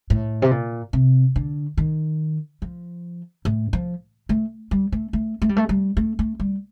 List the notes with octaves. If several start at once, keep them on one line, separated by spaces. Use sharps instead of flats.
A2
C3
A#2
C3
D3
D#3
F3
A2
F3
A3
G3
A3
A3
A3
G3
A3
G3
A3
A3
G3